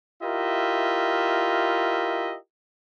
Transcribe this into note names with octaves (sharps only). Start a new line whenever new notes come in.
E4 F4 G4 A#4 D#5 E5